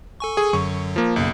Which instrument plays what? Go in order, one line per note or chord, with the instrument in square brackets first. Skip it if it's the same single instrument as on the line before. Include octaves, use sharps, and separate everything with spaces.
[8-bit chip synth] A4 G#5 C#6
[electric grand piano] G#4
[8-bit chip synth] F#2 D3 F#3 [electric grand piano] C#6
[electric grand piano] F3 A#3
[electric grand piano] B1 [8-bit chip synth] F#2 C#3 A#3